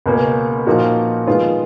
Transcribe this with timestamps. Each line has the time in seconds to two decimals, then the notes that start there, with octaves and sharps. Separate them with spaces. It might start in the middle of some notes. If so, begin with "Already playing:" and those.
0.06 C#2 B2 A#3 C#4
0.67 A#2 F3 A#3 D#4 F#4
1.27 D#3 G#3 B3 F4